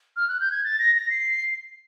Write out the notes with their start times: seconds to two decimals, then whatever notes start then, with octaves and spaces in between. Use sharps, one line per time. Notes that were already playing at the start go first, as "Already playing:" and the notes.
0.17 F6
0.29 F#6
0.40 G6
0.52 G#6
0.64 A6
0.79 A#6
0.96 A#6
1.10 C7